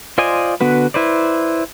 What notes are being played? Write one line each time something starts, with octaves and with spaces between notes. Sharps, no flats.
F4 C5 D5 D#5 G#5
D3 B3 F#4 B4
E4 B4 C5 D5